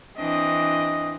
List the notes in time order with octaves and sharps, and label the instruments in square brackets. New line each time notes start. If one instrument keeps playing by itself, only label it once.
[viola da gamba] E3 C4 D4 [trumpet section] D#5